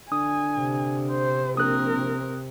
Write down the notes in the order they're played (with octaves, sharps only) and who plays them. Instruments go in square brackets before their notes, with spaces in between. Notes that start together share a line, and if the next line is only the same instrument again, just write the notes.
[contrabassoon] D3 [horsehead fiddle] G#5 [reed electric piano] D#6
[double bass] C3
[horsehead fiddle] C5
[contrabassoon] A#1 [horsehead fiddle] C4 A#4 [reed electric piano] D#6 F#6
[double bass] C3